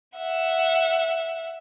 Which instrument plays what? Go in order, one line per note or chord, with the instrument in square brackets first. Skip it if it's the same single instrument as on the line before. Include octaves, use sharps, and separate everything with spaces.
[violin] E5 F#5